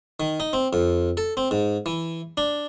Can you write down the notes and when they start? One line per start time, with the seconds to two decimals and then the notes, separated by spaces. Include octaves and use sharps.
0.20 D#3
0.40 D#4
0.53 C4
0.73 F2
1.17 A4
1.37 C4
1.51 G#2
1.86 E3
2.37 D4